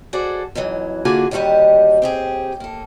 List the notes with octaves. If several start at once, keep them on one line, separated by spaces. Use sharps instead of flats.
F#4 G#4 A4 C5 D5
F2 G#2 E3 F#3
D3 A#3 F4 F#4 G#4 G#5
D#2 D3 G3 F#4 G4 D#5
C4 G4 G#4
A#3 A4